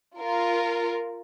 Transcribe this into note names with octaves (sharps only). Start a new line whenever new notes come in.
F4 A#4